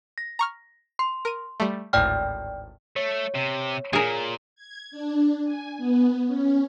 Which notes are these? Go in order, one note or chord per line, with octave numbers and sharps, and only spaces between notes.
A#6
A#5 C#6 F6
C6 C7
A#4 D#7
G3 A3
G#1 D2 A2 D5 G5 F6
A3 C#5
C3
A#2 G#4 A#4
G#6
D4
G#5
B3
C#4